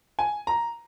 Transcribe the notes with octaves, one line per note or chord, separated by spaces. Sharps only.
G#5
A#5